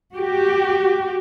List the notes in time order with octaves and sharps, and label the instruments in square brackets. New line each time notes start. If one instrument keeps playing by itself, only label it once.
[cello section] F#4 G4